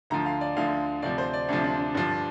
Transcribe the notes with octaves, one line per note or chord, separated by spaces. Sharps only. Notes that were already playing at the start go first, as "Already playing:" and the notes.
D2 D3 F3 A#5
F5
D5
D2 D3 F3 F5
D2 C3 F3 D5
C5
D5
D2 C3 F3 D4
D4
D4
G2 D3 F3 D4